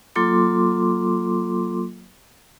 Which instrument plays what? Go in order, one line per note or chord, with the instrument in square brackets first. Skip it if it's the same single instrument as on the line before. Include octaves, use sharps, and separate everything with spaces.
[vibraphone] F#3 A#3 F4 A4 C6 D6